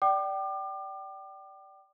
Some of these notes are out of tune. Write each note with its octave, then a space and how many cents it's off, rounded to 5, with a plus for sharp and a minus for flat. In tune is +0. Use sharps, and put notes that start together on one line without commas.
D5 +0 G5 -25 D6 +35